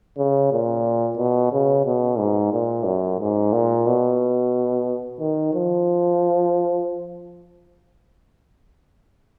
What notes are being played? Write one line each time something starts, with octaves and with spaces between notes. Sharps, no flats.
C#3
A#2
B2
C#3
B2
G#2
A#2
F#2
G#2
A#2
B2
D#3
F3